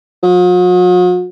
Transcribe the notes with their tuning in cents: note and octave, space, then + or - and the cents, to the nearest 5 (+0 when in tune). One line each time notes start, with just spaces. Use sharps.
F#3 -45